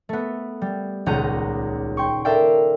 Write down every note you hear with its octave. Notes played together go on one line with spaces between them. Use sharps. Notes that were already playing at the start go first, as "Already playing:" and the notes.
A3 B3
G3
D#1 C#2 F#5 A#5 G6 D#7
G5 C6 C#6
A4 A#4 D5 E5 F5 G5